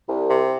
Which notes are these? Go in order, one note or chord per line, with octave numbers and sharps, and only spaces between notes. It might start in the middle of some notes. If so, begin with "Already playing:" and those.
C2
C3